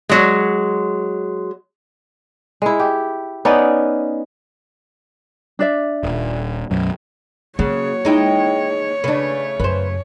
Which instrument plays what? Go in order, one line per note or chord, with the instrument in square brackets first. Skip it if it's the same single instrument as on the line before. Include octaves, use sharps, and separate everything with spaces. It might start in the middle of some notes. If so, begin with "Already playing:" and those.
[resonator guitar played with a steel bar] F#3 G#3
[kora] G#3 E4
G4
B3 C#4 D#4 D5
[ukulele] D4 D5 E5
[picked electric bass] D#1
B1 F#2
[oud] C#3 [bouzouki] F#3 [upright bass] A#3 [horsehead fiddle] C#5
[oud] G#3 D#4 E4 [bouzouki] D#5 G5
[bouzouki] C#3 A3 [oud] D4 B4
[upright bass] F#2 [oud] B4 C5